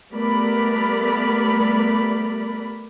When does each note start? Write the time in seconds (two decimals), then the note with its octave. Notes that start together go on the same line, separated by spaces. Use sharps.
0.12 G3 A3 B3 A#4 D5 B5